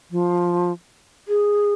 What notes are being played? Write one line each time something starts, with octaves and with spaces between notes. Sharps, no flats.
F3
G#4